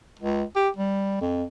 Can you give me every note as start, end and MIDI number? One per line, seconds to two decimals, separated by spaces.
0.20 0.43 37
0.56 0.69 67
0.77 1.17 55
1.21 1.43 41